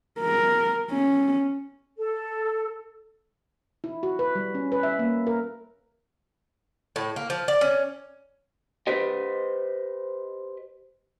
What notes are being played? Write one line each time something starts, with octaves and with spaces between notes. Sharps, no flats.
A#4
C#4
A4
E4
F#4
B4
G3
C#4
B4
E5
A#3
A#4
A2
A#3
F3
D5
C#4
G4 B4 C5 D#5